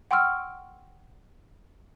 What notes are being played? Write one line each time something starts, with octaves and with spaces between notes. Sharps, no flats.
F#5 G5 C6 C#6 E6 F6